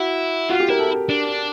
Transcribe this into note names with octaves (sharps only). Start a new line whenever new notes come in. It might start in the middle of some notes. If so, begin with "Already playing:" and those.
Already playing: E4 F#4
F4 F#4
G4
E4 A#4
A4
D4